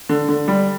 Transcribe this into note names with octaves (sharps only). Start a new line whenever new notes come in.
D3
D3
G3